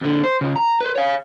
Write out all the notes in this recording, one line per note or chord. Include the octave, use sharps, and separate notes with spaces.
F2 D3
C5
C#3 F4
A#5
B4 C5
C#5 F5